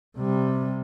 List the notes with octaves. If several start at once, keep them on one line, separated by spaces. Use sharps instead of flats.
C3 G3